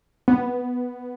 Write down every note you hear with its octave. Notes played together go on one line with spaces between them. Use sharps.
B3